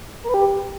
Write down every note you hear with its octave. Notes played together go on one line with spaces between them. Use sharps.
A#4
B4
G4